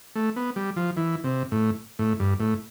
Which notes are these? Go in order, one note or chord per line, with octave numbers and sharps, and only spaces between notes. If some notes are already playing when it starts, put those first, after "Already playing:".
A3
B3
G3
F3
E3
C3
A2
A2
G2
A2